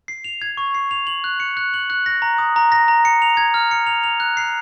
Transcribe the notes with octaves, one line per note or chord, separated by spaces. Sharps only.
C7
F7
G#6
C#6
C7
F7
F#7
F#6
C#7
F#6
F#7
F#6
A#6
A#5
D#6
A#5
A#6
A#5
C#7
F7
G#6
F6
C#7
F7
F7
F#6
C7